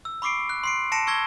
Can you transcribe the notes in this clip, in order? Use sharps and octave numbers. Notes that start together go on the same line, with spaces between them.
E6
B5 C#6 D6 C7 D7
F#6
C6 C7 D7
A5 A#6 C#7 D7 E7
C#6 E6 G#6 A#6 G7